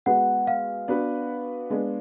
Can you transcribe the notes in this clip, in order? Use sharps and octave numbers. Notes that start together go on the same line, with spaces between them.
G#3 B3 F#4 B4 F#5
F5
B3 D4 F#4 B4
G#3 B3 D4